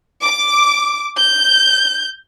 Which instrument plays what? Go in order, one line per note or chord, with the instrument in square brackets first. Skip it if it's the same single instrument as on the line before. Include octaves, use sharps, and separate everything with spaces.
[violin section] D6
G6